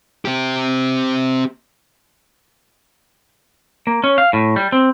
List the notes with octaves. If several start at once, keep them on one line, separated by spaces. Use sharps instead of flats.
C4 G4
A#3
C#4
F5
A2
G3
C4